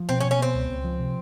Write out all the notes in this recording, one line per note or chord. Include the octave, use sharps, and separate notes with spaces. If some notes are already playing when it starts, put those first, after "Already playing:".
Already playing: F3
B2 C4
C#4
B2
C#4
B3 C4
C#2
C#2
F3
C3